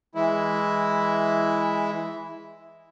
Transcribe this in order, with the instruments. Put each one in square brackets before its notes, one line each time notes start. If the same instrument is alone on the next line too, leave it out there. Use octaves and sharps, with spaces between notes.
[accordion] E3 G#3 E4